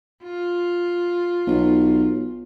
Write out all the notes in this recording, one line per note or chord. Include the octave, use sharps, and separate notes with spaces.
F4
B1